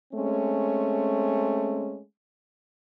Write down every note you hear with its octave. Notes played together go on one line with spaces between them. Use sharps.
G#3 A3 C4 C#4